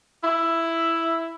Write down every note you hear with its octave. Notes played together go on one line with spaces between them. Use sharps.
E4